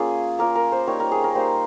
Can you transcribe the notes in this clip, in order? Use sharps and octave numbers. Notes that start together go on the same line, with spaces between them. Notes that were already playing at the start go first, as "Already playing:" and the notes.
Already playing: A#3 C#4 F4 G#4
A#3 C#4 F4 A#4
A#4
C5
G3 A#3 D#4 C#5
A#4
G#4
A#4
G3 A#3 D#4 C5